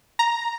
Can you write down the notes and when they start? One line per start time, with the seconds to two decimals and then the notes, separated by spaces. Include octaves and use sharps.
0.19 A#5